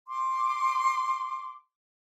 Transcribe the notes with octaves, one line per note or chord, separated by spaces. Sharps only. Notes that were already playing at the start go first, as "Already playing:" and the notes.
C6 D6